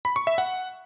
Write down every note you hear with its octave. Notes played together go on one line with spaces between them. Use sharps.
B5
C#6
E5
F#5